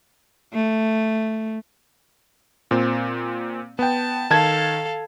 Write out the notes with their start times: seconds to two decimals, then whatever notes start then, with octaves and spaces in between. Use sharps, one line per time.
0.53 A3
2.71 A#2 C4
3.79 B3 G5 A5
4.30 D#3 A4 F5 A5 G#6